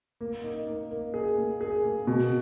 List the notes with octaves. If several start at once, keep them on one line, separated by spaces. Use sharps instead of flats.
A#3
D#4
A#3
A#3
G#4
A#3
G#4
A#3
B2